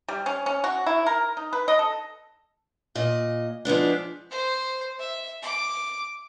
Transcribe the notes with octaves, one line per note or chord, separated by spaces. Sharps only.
G3
C#4
C#4
F#4
E4
A#4
D#4
B4
D#5
A4
A#2 D#5
F3 G#3 B3 D4
C5
E5
D6